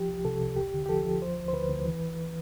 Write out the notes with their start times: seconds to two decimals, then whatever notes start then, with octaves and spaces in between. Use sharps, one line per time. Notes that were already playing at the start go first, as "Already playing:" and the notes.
Already playing: F3 G4
0.09 C2
0.25 C3 A4
0.41 C2
0.56 E2 G4
0.74 D3
0.86 G4
0.89 F3 A4
1.05 F3
1.21 D2 C5
1.37 D2
1.48 C5
1.53 D2 B4
1.70 D2
1.85 E3